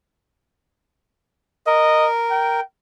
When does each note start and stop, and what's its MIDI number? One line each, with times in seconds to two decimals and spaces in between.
1.67 2.60 70
1.67 2.08 75
2.30 2.62 79